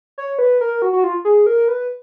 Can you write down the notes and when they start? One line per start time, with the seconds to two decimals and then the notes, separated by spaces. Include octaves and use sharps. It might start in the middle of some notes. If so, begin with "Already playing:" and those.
0.18 C#5
0.39 B4
0.61 A#4
0.82 F#4
0.93 F#4
1.04 F4
1.25 G#4
1.46 A#4
1.68 B4